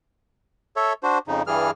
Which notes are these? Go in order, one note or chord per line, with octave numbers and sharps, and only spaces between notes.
A4 C#5 E5
D4 F#4 C5
F2 C#3 D#4
G2 E3 G3 G#4 F6